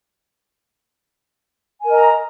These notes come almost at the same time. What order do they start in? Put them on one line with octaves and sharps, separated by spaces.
G#5 A#4 D#5 A#5